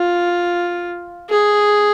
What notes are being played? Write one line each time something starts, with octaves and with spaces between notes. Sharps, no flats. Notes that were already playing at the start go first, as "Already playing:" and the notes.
Already playing: F4
G#4